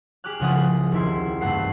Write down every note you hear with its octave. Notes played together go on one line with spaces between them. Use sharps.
G4 G#4 D6 F6 F#6
C2 C#3 F3 G#4 F#5 D#6
D#1 D#3 E4 C6
G2 C3 A3 F#5 C7